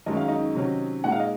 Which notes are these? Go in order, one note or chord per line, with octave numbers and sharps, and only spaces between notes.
F#2 D#3 G#3 C#4 D#5
F5
D#4 D#5
C3 D#3 F#3 C#4
A#2 G#3 D#4 F#5
F5
D#5